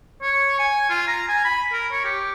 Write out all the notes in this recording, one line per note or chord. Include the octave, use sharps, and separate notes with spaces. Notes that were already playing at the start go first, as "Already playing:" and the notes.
C#5
G#5
F4
A#5
G#5
B5
A#4
C#5
G4